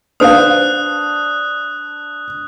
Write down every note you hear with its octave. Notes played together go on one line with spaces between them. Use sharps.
D4 B4 C5 F5 D#6 F#6